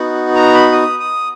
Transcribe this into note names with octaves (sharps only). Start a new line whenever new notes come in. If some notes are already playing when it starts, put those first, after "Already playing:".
Already playing: B3 D#4 F#4
A#5
B5
D#6
D#6